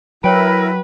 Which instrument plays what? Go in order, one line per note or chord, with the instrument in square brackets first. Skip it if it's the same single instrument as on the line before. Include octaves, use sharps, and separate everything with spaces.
[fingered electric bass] F#3 [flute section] E4 A#4 [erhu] B4 [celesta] C#5 G5 D7